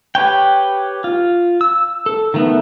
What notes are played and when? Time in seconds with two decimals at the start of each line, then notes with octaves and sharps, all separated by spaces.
0.15 G4 B4 C#5 G5
1.04 F4
1.61 E6
2.06 A4
2.34 D#3 A3 B3